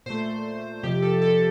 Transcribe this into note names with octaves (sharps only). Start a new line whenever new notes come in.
A#2 A3 C5
F2 C3 F3 G4
A4
A4